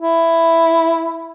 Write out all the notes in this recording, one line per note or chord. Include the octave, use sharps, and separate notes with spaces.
E4